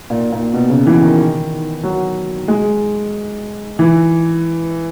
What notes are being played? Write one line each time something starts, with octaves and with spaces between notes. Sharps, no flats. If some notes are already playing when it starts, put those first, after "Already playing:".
A#2
A#2
B2
C#3
E3
D#3
F#3
G#3
E3